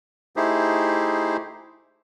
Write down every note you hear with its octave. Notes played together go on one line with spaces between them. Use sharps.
A3 D#4 E4 G4 G#4 C5